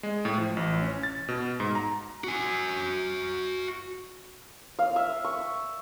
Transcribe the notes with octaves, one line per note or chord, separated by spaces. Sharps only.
G#3
A2
F3
A1
C#4
A6
B2
G#2
A#5
F#4 G#5
F5
E5
C#6